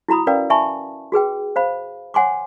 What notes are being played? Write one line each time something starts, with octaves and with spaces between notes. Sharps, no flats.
E4 F#4 A#5 B5 D#6
C#4 A#4 B4 D5 F5 G5
E5 G#5 A5 B5 C#6
F#4 G#4 B4 G5
C5 F5 B5
C#5 F#5 G#5 C6 D6